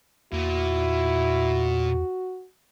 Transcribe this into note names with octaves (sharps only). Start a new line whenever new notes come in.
E2 A#2 E4 F#4